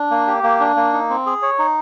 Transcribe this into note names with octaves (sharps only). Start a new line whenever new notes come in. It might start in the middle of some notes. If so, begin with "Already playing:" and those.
Already playing: D4
A#3
G4
A#3
D4
A#3
D#4
C4
G#4
C#5
D#4